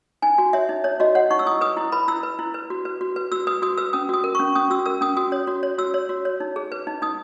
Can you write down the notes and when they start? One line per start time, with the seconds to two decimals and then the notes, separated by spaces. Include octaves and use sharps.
0.22 D#4 G#5
0.38 F#4
0.53 C#5 E5
0.69 D#4
0.84 D#4 C#5
1.00 F#4 D#5
1.15 C#5 F#5
1.31 D#4 C#6
1.39 E6
1.46 E4 D#6
1.61 B4 D#6
1.77 E4
1.92 B4 B5
2.08 E4 E6
2.23 B4
2.39 E4
2.54 B4
2.70 F#4
2.85 B4
3.01 F#4
3.16 B4
3.32 F#4 E6
3.47 B4 D#6
3.62 F#4 D#6
3.78 B4 E6
3.93 C#4 D#6
4.09 F#4 D#6
4.24 A#4
4.35 C#6
4.39 C#4
4.55 C#4 D#6
4.70 F#4 E6
4.85 A#4 E6
5.01 C#4 D#6
5.17 F#4 D#6
5.32 C#5
5.47 F#4
5.63 C#5
5.78 F#4 E6
5.94 C#5
6.09 F#4
6.25 C#5
6.40 D#4
6.56 G#4
6.72 B4
6.87 D#4
7.02 D#4 D#6